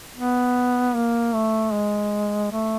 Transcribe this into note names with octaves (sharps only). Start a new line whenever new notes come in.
B3
A#3
A3
G#3
A3